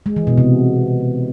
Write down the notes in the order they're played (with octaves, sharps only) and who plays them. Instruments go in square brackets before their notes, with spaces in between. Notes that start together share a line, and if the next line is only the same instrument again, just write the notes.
[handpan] G#3
E3
B2
C3